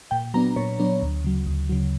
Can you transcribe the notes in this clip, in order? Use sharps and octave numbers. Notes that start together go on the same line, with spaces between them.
A#2 G5
F#3 B3 D4 A#5
A#2 C#5
F#3 B3 D4
D2
C#3 F#3
D2
C#3 F#3